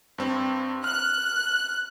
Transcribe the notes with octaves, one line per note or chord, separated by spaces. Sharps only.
G2 C4
F6 F#6